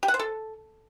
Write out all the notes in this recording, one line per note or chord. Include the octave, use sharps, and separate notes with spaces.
G4
F#5
C5
A4